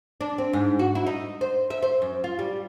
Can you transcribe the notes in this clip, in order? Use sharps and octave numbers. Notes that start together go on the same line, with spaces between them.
D4
C4
G#2
F#4
E4
D#4
C5
E5
C5
F#2
F4
G3